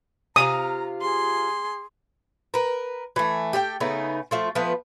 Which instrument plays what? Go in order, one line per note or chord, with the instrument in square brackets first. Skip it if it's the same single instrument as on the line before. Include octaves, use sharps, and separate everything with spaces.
[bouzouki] C3 F4 F5 [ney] A#5 [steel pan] D#6
[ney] G#4 [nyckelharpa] C6
[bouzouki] A#4 B4
E3 A3
G4 A4 F5 G5
C#3 A3 B3 D#4
F3 A3 F4
F3 A3 B3 B4